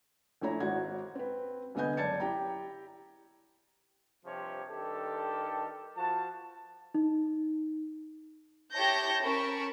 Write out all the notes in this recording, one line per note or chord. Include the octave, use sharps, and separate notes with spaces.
A#1 A3 E4 C#5 A#5
G#1 F#4 F#5 G#6
C4 B4
C2 D3 B3 D#5 G#5 G6
F#1 D5 A5 G#6 A6 C#7
E4 G4 G5 A#5
G2 C3 F3 G4 C#5
G2 D#3 G4 A4
F3 F#4 A5
D#4
E4 G4 C#5 A5 G6 A#6
C#4 A#4 A5 B5 C#6